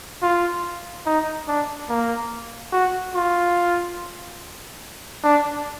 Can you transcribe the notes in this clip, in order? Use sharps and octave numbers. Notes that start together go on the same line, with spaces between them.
F4
D#4
D4
A#3
F#4
F4
D4